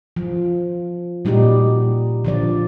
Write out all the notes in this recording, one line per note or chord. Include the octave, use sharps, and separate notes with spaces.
F3
A#2 G3 D#4 F#4 G4
D3 F3 D5